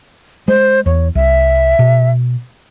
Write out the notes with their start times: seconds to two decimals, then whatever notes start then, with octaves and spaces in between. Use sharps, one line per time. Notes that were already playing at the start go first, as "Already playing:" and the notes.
0.48 G#3 C5
0.86 E2 C#5
1.15 C2 E5
1.79 B2